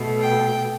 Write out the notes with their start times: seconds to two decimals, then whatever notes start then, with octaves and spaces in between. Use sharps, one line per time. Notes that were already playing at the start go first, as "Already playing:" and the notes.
Already playing: B2 A3
0.20 G5